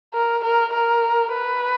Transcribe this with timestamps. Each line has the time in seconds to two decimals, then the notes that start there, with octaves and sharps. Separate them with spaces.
0.13 A#4
0.44 A#4
0.73 A#4
1.33 B4